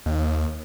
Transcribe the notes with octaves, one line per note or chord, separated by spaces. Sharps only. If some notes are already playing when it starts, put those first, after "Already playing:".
D#2